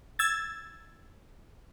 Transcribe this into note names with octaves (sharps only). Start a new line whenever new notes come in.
E6 G#6 A6